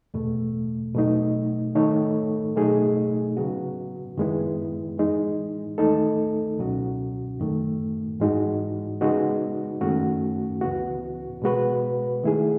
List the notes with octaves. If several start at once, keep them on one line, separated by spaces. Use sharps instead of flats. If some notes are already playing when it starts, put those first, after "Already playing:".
E2 B2 A3
B2 F#3 A3 D#4
D#3 A3 D#4 A4 C#5
B2 F#3 A3 D#4 G#4
C#3 F#3 B3 F#4
F#2 D#3 G#3 B3 E4
E3 G#3 D#4
D#2 D#3 A3 D#4 A4
C#2 B2 F#3 C#4 F#4
F#2 D#3 A3
G#2 E3 G#3 D#4 F#4
C#3 G#3 B3 D#4 F#4
F#2 D#3 A3 C#4 F#4
C#2 C#3 E3 B3 F#4
B2 G#3 B3 F#4 B4
D#3 A3 E4 G#4